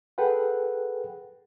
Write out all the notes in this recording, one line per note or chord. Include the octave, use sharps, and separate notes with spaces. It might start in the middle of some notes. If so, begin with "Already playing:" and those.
G#4 A4 B4 F#5 G5